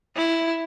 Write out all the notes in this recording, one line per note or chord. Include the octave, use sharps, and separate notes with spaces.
E4